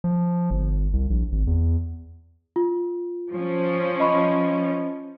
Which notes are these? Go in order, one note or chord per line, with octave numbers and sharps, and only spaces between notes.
F3
G1
C2
A#1
G#1
E2
F4
F3 C#4
D#5 B5 C#6